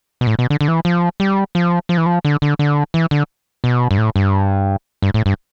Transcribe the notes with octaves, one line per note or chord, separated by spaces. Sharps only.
B2
A2
B2
D3
D3
E3
F3
G3
F3
F3
E3
F3
D3
D3
D3
E3
D3
B2
G2
A2
G2
G2
A2
G2